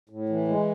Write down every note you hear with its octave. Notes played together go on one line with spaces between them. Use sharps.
A2
E3
G#3